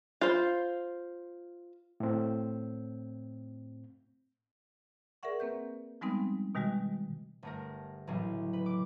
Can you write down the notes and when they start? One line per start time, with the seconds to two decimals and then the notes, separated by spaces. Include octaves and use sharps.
0.21 F4 C5
2.00 A2 C4
5.23 G#4 A#4 D5 E5 F#5 C#6
5.40 A#3 C4 B4 G6
6.01 F3 G3 G#3 B3 C4 D#4
6.55 B2 D#3 G3 G#3 F#4
7.43 G1 A3 A#4
8.07 B1 A2 C#3 E3 F#3
8.53 B4
8.66 D6